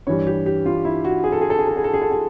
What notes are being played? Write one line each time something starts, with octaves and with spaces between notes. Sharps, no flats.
G2 E3 G3 C#5
G4
G4
F4
E4
F#4
G#4
A4
G#4
A4
G#4
A4
G#4
A4
G#4
A4
G#4